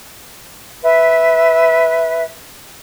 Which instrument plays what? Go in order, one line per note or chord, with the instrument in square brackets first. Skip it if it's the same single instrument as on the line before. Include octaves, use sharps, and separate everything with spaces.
[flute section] B4 E5